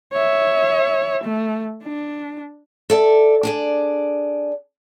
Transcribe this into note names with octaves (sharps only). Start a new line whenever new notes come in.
C#5 E5
A3
D4
A4 D5 E5
D4 G#4 D5